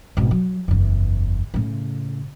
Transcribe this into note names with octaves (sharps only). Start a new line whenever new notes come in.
G#1 B2
F#3
F#1 E2
A2 C#3